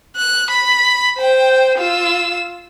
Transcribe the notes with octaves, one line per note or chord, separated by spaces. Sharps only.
F#6
B5
C5 G5
F4 E6